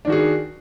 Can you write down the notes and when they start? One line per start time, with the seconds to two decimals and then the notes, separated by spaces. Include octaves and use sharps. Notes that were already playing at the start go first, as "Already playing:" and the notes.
0.05 D4
0.07 D#3
0.10 F#4
0.12 G#4